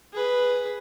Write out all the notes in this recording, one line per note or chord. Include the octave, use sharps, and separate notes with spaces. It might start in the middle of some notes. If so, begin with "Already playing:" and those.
G#4 B4